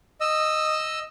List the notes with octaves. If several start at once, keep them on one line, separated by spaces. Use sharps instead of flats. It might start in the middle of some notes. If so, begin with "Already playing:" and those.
D#5 E6